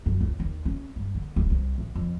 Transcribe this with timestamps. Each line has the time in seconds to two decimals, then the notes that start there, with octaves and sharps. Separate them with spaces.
0.06 F#2
0.21 C#2
0.40 D#2
0.65 C#4
0.96 G2
1.15 D3
1.36 D1
1.50 C2
1.78 A1
1.95 F2